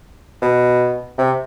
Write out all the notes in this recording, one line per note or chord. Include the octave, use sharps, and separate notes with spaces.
B2
C3